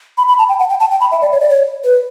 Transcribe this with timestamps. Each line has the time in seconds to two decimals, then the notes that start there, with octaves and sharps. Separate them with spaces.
0.18 B5
0.28 B5
0.38 A5
0.49 G5
0.59 F#5
0.69 G5
0.80 A5
0.91 G5
1.01 B5
1.11 E5
1.21 D5
1.32 C#5
1.40 D5
1.49 C#5
1.84 B4